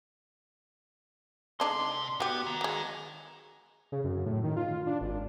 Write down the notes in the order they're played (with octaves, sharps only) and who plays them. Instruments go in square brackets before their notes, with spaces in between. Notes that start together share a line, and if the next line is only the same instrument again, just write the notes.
[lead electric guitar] C3 C6 [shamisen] G#3 D4 D#4
[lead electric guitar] B3 [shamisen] F#4 G4
[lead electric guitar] D#3
[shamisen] F#3 G#3
[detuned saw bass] C#3
F#2
A2
D#3
F4
D4
G#1